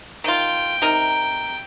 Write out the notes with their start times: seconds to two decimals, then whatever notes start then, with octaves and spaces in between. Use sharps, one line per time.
0.24 D#3 F4 G5
0.82 C3 D#4 A#4